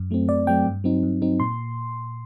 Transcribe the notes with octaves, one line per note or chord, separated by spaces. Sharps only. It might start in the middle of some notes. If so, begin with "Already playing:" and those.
Already playing: F#2
F#3 A3 C4
F#2 D5
F#3 A3 C4 G5
G2
F#3 C4 D#4
G2
F#3 C4 D#4
A#2 C6